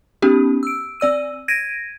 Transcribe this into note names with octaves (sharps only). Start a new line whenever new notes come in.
B3 C#4 D#4 G4
E6 D7
C4 D5 E6 D#7
G#6 A#6 D7 D#7